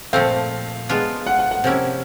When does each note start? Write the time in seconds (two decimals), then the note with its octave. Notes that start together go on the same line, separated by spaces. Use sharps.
0.13 A#2 F3 A3 C4 F5
0.89 G#3 B3 D4 F4
1.26 F#5
1.39 F#5
1.51 F#5
1.64 C3 F3 A#3 C#4 E4